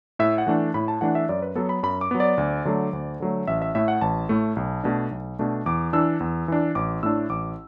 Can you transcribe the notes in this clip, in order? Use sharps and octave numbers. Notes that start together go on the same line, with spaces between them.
A2 E5
F#5
E3 A3 D4
A2 B5
A5
E3 A3 D4 F#5
E5
F#2 D5
B4
F#3 B3 A4
B5
F#2 B5
D6
F#3 B3
D5
D2
D3 F#3 A3
D2
D3 F#3 A3
A1 E5
E5
A2 A3 E5
F#5
A1 A5
A2 A3
B1
B2 A3 D4
B1
B2 A3 D4
E2 D6
E3 D4 E6
E2
E3 D4
A1 D6
A2 A3 D4 E6
A1 D6